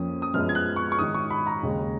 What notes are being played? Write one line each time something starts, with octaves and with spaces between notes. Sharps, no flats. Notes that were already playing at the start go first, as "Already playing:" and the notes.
Already playing: F2 F3 A#3 C#4 D#6
D#6
F#2 F3 G#3 B3 F6
G#6
F#6
C#6
C#6
G#2 D#3 G#3 D#6
C#6
B5
A#5
D#2 C#3 G#3